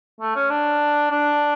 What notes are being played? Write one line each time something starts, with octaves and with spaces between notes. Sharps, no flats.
A3
C#4
D4
D4